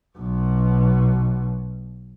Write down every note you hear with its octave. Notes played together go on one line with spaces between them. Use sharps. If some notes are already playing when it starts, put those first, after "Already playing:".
B1 B2